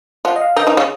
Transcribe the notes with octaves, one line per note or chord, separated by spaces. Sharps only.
F3 F4 F#5
D#5
F5
D#3 D#4 D#5
D#3 D#4
C#3 C#4